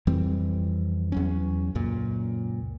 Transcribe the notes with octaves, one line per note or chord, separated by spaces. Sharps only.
F2 E3 G3 C4
E2 F#3 C#4
C#2 F#2 A#2